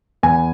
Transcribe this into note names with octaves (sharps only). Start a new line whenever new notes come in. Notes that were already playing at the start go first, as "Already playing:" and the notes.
E2 G#5